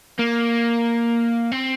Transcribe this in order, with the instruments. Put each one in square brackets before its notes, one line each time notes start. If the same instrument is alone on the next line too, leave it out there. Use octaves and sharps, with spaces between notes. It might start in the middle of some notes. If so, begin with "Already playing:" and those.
[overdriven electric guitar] A#3
C4